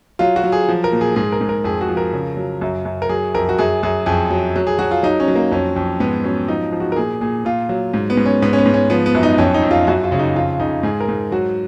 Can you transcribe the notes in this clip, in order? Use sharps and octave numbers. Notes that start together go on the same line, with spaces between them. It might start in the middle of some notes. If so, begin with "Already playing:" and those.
F#3 F4
F#4
F#3
G#4
F3
A#4
A#2
G#4
G#2 G#4
A#4
G#2
A#4
F2 G#4
F#4
F3
A#4
C#3
F#3
F#2
F#2
A#4
F#3 G#4
F2 A#4
F#4
F#2 G#4
F#2 G#4
F2 G#4
F#3
F#3
G#4
F#3 F#4
F4
F#3 D#4
C#4
F#3
A#3
F2 C#4
F2
G#2 B3
F#3 C#4
F3 D#4
F3
F#4
A#4
A#2 G#4
A#2 G#4
A#2 F4
F#3
G#2
B3
G#2
C#4
G#2 B3
C#4
B3
G#2
C#4
F3 B3
B3
F#2
D#4
F2 C#4
D#4
F2
F4
F#2 F#4
F4
C#3
D#4
F2 F4
C#3 D#4
G#2 G#4
A#4
G#2
F#3 F#4